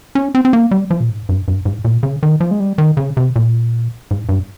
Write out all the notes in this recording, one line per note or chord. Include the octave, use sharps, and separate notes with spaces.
C#4
C4
C4
A#3
G3
F3
A#2
G#2
G2
G2
G#2
A#2
C#3
D#3
F3
G#3
G3
D#3
C#3
C3
A#2
G#2
G2